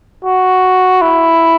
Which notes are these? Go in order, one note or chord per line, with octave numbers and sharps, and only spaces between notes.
F#4
E4